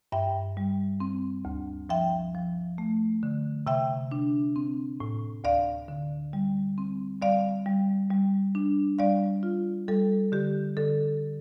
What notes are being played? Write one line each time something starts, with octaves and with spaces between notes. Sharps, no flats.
G2 E5 G5
G3
C4
D2
F3 E5 G5
F3
A3
D3
C3 E5 G5
D4
C4
A2
D2 D5 F5
D3
G3
C4
G3 D5 F5
G3
G3
D4
G3 D5 F5
F4
G3 A4
D3 G4
D3 A4